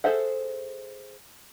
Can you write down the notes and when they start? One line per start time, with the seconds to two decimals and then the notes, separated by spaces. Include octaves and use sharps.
0.04 G#4 A4 C5 E5 F#5